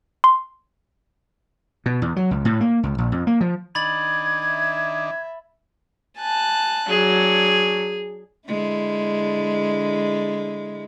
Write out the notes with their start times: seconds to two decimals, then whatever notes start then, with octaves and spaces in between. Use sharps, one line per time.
0.24 C6
1.86 B2
2.02 E2
2.16 F#3
2.31 C#2
2.45 A2
2.61 A#3
2.83 C#2
2.98 A#1
3.12 F2
3.27 A#3
3.41 F3
3.75 D#3 D4 B5 G#6 A6 F#7
4.46 E5
6.18 G#5 A5 F#6
6.89 F#3 D4 G#4
8.47 D3 G#3 E4